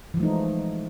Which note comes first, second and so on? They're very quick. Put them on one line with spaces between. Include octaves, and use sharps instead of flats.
E3 F3 A3 D#4 G#3